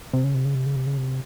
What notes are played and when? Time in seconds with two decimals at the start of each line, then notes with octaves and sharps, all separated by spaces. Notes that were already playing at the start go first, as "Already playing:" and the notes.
0.13 C3
0.24 C#3
0.34 C3
0.45 C#3
0.55 C3
0.66 C#3
0.76 C3
0.87 C#3
0.98 C3